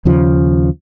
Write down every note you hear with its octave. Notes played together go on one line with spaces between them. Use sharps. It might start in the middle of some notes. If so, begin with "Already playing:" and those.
D#2 C#3 F3